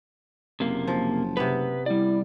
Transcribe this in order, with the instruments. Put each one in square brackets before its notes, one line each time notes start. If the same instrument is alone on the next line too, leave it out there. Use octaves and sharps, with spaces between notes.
[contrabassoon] F#1 [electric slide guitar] C3 A#3
[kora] F3
[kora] C3 B3 [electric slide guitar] B4
[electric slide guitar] G3 D5 [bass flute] E4